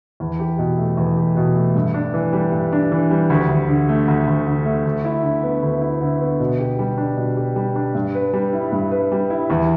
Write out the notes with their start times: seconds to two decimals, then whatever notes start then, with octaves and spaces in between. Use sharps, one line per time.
0.20 E2
0.40 G4
0.59 B2
0.78 A3
0.97 E2
1.17 G4
1.37 B2
1.55 A3
1.75 G2
1.94 D4
2.14 E3
2.33 G3
2.52 G2
2.73 D4
2.92 E3
3.11 G3
3.30 D2
3.49 D2
3.69 D3
3.89 A3
4.08 D2
4.27 D2
4.47 D3
4.66 A3
4.85 D2
5.05 E4
5.23 D3
5.43 B3
5.63 D2
5.82 E4
6.01 D3
6.21 B3
6.40 B2
6.59 G4
6.79 G3
6.98 D4
7.17 B2
7.37 G4
7.56 G3
7.76 D4
7.95 G2
8.15 B4
8.33 G3
8.53 E4
8.72 G2
8.91 B4
9.12 G3
9.30 E4
9.50 E2